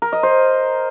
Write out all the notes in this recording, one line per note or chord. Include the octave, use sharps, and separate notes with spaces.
A#4
D#5
C5